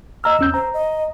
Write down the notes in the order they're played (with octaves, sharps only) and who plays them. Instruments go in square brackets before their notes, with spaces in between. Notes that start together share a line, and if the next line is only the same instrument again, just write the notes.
[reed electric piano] D#5 A#5 F6 [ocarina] E6
[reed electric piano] E2 C#4 G6
[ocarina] C5 [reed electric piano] A#5
[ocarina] D#5